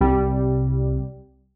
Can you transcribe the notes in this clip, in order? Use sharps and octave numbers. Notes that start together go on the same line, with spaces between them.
C2 G3